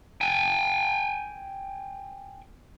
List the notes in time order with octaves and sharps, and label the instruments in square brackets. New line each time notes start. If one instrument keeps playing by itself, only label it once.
[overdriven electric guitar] G5 G#5